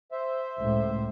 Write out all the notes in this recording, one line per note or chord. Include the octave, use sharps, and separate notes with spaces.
C5 E5
C#2 A2